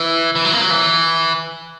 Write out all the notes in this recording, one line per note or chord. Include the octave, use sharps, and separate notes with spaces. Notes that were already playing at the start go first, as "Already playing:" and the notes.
Already playing: E3
E3
F#3
A#3
F#3
E3